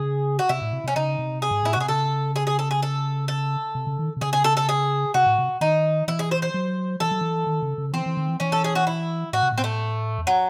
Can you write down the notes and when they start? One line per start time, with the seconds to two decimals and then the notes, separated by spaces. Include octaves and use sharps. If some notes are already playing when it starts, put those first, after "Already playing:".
Already playing: C#3 G#4
0.39 F#4
0.49 C3 E4
0.61 A2
0.72 C3
0.84 C3 C#4
0.96 C#3 D#4
1.19 C3
1.42 G#4
1.51 G#2
1.63 A2 E4
1.73 F#4
1.76 C3 G#4
1.88 C#3 A4
2.36 G#4
2.47 G#4
2.59 A4
2.71 G#4
2.82 A4
3.28 A4
3.75 C3
3.87 C#3
3.99 D#3
4.17 C3
4.21 C#3 G#4
4.33 G#4
4.44 A4
4.57 A4
4.69 G#4
5.14 C3 F#4
5.26 A2
5.38 C3
5.61 D#3 D#4
6.08 E3 E4
6.19 G#4
6.31 C5
6.42 C5
6.54 F#3
7.00 E3 A4
7.11 F#3
7.21 E3
7.47 D#3
7.62 C#3
7.78 C#3
7.93 E3 C4
8.06 E3
8.17 D#3
8.28 E3
8.40 E3 C#4
8.52 A4
8.64 G#4
8.75 F#4
8.87 E4
9.33 A2 F#4
9.43 C3
9.52 A2
9.58 C4
9.64 A3
10.18 E2
10.27 F#3